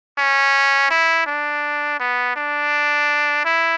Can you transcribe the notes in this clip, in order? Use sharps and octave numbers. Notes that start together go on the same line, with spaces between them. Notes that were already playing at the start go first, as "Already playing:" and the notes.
C#4
E4
D4
B3
D4
E4